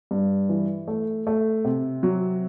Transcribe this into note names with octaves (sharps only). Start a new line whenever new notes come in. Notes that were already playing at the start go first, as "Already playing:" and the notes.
G2
E3
A3
A3
C3
F#3